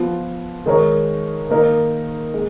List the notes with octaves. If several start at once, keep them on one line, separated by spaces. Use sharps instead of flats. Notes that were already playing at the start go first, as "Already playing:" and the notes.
Already playing: F3 B3 F4
D#3 G#3 D#4 A#4 C#5
D#3 A#3 D#4 A#4
G#3